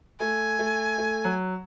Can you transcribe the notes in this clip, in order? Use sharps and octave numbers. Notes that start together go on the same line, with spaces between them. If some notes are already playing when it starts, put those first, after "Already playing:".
A3 G#5
A3
A3
F#3